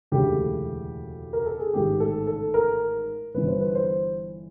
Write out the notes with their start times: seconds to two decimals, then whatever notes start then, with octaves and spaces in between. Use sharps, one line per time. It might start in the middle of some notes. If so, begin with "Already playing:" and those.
0.12 E1 D2 C#3 E3 G4
1.33 A#4
1.46 A4
1.59 G#4
1.73 A1 G#2 D#3 G4
2.00 A4
2.27 A4
2.54 A#4
3.34 G1 G2 E3 B4
3.47 C5
3.61 B4
3.75 C5